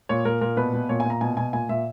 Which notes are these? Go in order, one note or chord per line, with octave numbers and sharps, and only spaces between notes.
A#2 C#5
A#2 A#4
A#2 A#4
B2 B4
B2
A#2 C#5
G#5
A#2
A#5
B2 G#5
B2 G#5
A#2 G#5
A#2 E5